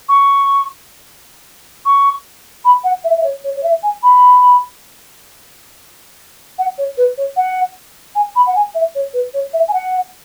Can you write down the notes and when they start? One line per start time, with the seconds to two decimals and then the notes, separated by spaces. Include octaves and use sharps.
0.08 C#6
1.85 C#6
2.64 B5
2.84 F#5
3.04 E5
3.17 E5
3.23 C#5
3.44 C#5
3.56 C#5
3.63 E5
3.83 G#5
4.03 B5
6.58 F#5
6.78 C#5
6.97 B4
7.17 C#5
7.36 F#5
8.15 G#5
8.35 B5
8.46 F#5
8.55 G#5
8.74 E5
8.95 C#5
9.13 B4
9.33 C#5
9.53 E5
9.68 G#5
9.73 F#5